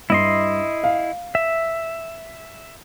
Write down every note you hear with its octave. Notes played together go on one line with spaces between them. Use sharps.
G2 E4 D#5 C6
F5
E5